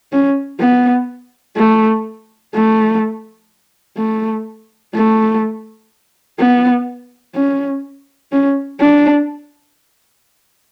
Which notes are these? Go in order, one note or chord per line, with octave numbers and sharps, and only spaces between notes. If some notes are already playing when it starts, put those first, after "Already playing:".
C#4
B3
A3
A3
A3
A3
B3
C#4
C#4
D4